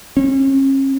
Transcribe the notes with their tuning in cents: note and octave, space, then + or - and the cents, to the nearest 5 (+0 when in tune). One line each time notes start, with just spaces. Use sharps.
C#4 -40